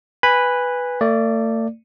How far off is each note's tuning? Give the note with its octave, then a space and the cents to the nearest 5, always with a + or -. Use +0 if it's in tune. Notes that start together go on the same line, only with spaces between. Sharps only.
B4 +0 G#5 -20 B5 +0
A3 +40 D5 +0